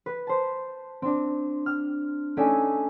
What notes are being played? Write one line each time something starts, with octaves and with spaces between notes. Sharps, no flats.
B4
C5 A5
C4 D4
F6
A3 C#4 D#4 D5 E5 G#5